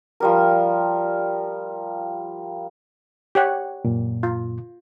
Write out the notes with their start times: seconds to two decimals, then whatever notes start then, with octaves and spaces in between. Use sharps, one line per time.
0.20 F3 G3 A#4
3.35 G4 C#5 F#5
3.85 F#2 A#2
4.23 F4